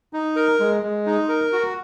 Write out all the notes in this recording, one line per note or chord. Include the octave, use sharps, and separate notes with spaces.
D#4
A#4
G#3
G#3
D#4
A#4
F#4